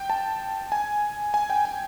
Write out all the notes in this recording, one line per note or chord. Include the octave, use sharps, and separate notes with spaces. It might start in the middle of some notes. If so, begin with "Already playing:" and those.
Already playing: G5
A5
G#5
G#5
G5
G#5